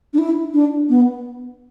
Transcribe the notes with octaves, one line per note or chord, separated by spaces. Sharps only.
D4
E4
D4
B3